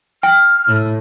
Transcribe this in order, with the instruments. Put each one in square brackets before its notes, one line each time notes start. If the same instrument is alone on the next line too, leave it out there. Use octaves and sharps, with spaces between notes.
[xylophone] G5 [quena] F6
[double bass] A2